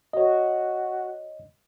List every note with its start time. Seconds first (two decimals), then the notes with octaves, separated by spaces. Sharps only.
0.13 F#4 C#5 D#5